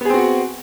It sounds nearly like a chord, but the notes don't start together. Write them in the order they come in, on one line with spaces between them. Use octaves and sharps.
B3 G#4 C4 F#4